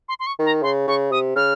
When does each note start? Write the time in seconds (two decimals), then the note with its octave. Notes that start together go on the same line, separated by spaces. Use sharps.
0.09 C6
0.20 C6
0.27 C#6
0.39 D#3
0.46 A#5
0.63 C#3 C6
0.87 C#3 C#6
1.11 C3 D#6
1.36 C#3 F6